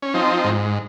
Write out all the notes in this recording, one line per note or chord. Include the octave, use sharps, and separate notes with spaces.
C#4
F3 C4 D#4
G#2